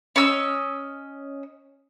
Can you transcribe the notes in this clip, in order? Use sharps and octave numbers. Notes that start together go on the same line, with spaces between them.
C#4 D#5 E6